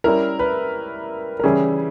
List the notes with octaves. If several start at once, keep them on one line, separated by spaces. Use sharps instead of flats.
G3 C#4 E4 A#4
B4
A#4
C#3 E3 G3 C#4 E4 G#4